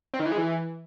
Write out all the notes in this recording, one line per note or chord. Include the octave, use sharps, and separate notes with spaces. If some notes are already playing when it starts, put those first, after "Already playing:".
C4
D#3
E3
G#3
E3